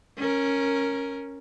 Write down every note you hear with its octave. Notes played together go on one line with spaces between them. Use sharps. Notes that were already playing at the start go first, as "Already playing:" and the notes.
C#4 A#4